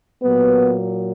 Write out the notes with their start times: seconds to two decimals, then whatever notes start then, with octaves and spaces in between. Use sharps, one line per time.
0.23 A#2 F#3 A#3 B3 B4